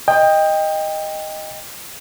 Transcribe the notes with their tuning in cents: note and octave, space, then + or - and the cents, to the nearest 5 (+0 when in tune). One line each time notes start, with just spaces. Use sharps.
D#5 +0 G5 +20